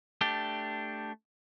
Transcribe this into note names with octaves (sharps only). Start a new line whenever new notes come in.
A3 D4 G4